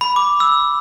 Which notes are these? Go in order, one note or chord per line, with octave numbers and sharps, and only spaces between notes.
B5
D6
E6